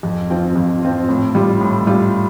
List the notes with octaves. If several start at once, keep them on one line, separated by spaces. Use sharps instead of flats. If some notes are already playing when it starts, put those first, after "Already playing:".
F2
F3 C4 F4
F2
F3 C4 F4
A2
G3 F4
A2
G3 F4